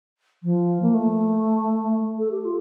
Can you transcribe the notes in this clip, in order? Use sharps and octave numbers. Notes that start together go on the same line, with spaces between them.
F3
A#3
A3
A4
G4
F4